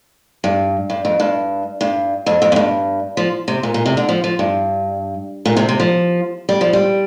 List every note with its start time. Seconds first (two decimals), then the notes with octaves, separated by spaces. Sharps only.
0.44 G2
0.90 G2
1.05 F2
1.20 G2
1.81 G2
2.26 F2
2.42 F2
2.52 F2
2.56 G2
3.17 F3
3.48 C3
3.63 A#2
3.74 A#2
3.86 C3
3.97 D3
4.09 F3
4.24 F3
4.39 G2
5.46 A#2
5.57 C3
5.69 C3
5.80 F3
6.49 G3
6.61 F3
6.73 G3